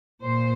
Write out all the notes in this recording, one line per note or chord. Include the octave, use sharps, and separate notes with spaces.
A#2 C5